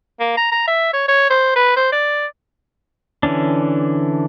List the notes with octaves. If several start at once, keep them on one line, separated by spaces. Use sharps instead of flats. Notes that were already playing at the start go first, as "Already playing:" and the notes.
A#3
A#5
A#5
E5
C#5
C#5
C5
B4
C5
D5
D3 E3 C#4 D4